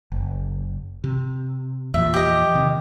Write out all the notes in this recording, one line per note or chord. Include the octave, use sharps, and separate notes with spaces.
F#1
C3
E2 A#2 F3 E5
G4 D#5
C3 D#3